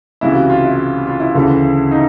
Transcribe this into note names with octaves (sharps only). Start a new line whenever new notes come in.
C#2 C3 E3 E4
F#4
F4
E4
F4
E4
D2 C#3 E3
D#4